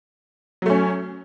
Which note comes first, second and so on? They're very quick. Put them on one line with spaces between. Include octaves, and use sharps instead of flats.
F#3 A3 C#4